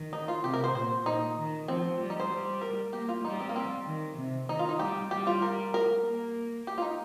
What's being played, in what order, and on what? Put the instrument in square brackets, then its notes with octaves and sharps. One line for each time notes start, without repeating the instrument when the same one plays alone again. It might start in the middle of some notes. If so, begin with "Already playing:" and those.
Already playing: [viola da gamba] D#3
[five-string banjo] D#4
F4
[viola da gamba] C3 [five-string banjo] G4
[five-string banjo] A#4
C5
[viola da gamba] A#2 [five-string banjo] C5
[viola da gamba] A#2 [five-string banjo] D#4
[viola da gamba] D#3
[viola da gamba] F3 [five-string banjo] C4
[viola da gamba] G3
[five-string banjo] D#4
C5
[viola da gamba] G3
[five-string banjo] A#4
[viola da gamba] A#3 [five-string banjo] G4
[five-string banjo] F4
[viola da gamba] G3 [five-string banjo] D#4
[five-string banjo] C4
A#3
C4
[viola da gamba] D#3
C3
[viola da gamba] D#3 [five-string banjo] D#4
[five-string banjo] F4
D#4
[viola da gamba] G3 [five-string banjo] G4
[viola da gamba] G3 [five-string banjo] G4
[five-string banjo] F4
A#4
A#4
[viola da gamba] A#3
[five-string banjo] G4
F4
D#4